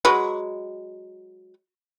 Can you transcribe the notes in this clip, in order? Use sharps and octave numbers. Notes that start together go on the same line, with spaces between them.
F#3 G#3 B4